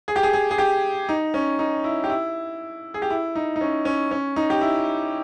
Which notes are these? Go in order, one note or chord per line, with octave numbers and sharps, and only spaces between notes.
G#4
G4
G#4
G#4
G#4
G4
D#4
C#4
D#4
E4
G4
E4
G#4
G4
E4
D#4
D#4
C#4
C#4
C#4
D#4
G4
E4